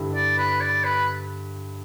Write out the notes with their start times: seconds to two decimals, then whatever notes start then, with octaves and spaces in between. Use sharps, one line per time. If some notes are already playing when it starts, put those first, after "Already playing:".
Already playing: G2 D3 G3 E4
0.15 D5
0.38 B4
0.61 D5
0.84 B4